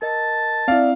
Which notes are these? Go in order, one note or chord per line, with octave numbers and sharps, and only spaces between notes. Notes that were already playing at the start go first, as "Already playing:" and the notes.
A#4 D#5 A5
C4 E4 D5 E5 F5